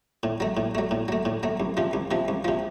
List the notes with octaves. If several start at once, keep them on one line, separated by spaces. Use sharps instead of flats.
A2
F#3 A3
A2
F#3 A3
A2
F#3 A3
A2
F#3 A3
C2
C3 F3
C2
C3 F3
C2
C3 F3